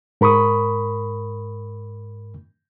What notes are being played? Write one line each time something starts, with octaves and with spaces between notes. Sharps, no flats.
G#2 A#4 B5 C#6 D#6